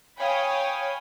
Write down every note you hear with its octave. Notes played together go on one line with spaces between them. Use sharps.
C#5 F5 G5 G#5 B5 D#6